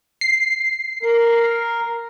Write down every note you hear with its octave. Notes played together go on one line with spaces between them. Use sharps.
C7
A#4